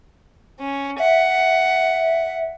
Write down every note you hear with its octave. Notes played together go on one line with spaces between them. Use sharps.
C#4
E5 F#5